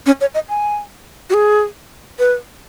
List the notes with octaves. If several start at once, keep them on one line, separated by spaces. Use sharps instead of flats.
C#4
C#5
D#5
G#5
F#4
G#4
B4